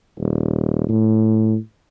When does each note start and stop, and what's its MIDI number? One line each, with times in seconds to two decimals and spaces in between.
0.19 0.87 27
0.89 1.56 45